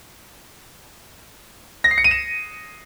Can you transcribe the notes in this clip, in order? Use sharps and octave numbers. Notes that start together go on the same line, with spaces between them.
A#6
C7
C#7
D#7
E7